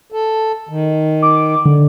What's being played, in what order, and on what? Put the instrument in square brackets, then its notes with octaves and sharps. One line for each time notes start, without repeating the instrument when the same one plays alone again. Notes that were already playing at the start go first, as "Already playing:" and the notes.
[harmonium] A4
D#3
[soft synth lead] D6
D3